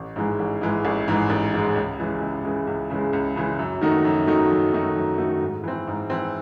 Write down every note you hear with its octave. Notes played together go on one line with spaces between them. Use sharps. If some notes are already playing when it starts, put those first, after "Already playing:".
Already playing: A1
G#2 E3 G#3
A1
G#2 E3 G#3
A1
G#2 E3 G#3
A1
G#2 E3 G#3
C#2
C#3 E3 G#3
C#2
C#3 E3 G#3
C#2
C#3 E3 G#3
C#2
C#3 E3 G#3
F#2
D#3 A3 D#4 F#4
F#2
D#3 A3 D#4 F#4
F#2
D#3 A3 D#4 F#4
F#2
D#3 A3 D#4 F#4
G#2
E3 C4
G#2
E3 C4